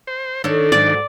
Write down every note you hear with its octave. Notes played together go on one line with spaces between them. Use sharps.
C5
D#3 D4 A4 C#5
G#2 F#3 D5